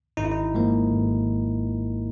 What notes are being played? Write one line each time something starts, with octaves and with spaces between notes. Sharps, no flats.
G#1 D#4
E4
D#4
G#2 F3 A#3
G#1